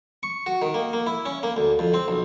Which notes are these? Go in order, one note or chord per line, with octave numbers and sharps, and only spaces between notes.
C#6
F#4
D#3
A#3
A#3
E4
C#4
A#3
D2
F2
C4
B1